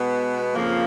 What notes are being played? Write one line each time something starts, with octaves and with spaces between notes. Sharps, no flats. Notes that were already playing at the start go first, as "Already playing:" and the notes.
Already playing: B2 G#3 B3
F2 C#3 F3 A#3